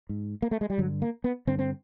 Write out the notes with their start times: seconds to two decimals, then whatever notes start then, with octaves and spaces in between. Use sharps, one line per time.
0.09 G#2
0.42 A#3
0.51 A3
0.61 G#3
0.70 G3
0.78 G2 D3 F#3
1.02 A#3
1.24 B3
1.47 G2 D3 C4
1.59 C4